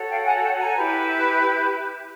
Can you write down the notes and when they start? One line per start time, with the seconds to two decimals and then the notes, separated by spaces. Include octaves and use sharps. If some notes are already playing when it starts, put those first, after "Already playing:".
Already playing: F#4 A4 C#5
0.10 F5 G5
0.26 F#5 G#5
0.43 G5 A5
0.60 G#5 A#5
0.76 E4 G4 B4